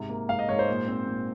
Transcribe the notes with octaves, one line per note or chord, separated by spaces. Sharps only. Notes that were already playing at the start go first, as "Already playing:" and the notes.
Already playing: G#2 C3
A#3
G#2 F5
D#5
G#2 C#5
C5
A#2
C4
A#2